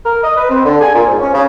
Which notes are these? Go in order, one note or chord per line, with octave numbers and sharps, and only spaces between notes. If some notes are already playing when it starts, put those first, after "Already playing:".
A#4
D#5
B4
C4
D3
G#5
A#2
G#2
C#4
C#3